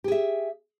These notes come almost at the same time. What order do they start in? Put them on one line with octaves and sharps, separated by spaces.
G4 G#4 E5